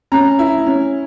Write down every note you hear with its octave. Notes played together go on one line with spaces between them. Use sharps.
C#4 A#5
E4
C#4